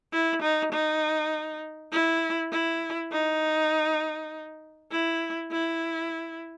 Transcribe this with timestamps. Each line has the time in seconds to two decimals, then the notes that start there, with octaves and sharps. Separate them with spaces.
0.13 E4
0.42 D#4
0.72 D#4
1.92 E4
2.52 E4
3.12 D#4
4.92 E4
5.52 E4